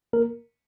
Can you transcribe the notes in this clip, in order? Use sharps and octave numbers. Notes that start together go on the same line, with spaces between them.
A#3 A#4